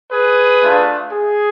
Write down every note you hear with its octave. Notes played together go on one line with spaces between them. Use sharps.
G#4 B4
A3 D4 F4
G#4